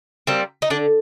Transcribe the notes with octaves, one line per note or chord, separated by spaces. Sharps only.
G3 A#3 C4
D#4
D3 D4